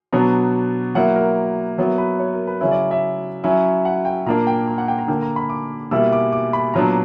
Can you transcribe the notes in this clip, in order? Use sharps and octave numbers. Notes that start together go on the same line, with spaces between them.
B2 F#3 B3 D4 A#5
F#3 A#3 E4 F#5
A#4
F#3 B3 E4 A#4
B4
C#5
A#4
B4
C#3 F#3 C#4 E4
D5
E5
F#3 C#4 E4
F#5
G5
A#2 A#3 D4 A#5
G5
A#5
F#5
G5
A#5
D3 A#3 D4 G5
A#5
B5
D6
B2 G3 A#3 E4 E6
D6
D6
B5
A#2 F#3 B3 D4 A#5